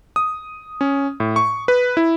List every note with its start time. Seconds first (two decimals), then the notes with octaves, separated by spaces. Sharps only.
0.16 D#6
0.81 C#4
1.20 A2
1.36 C#6
1.68 B4
1.97 E4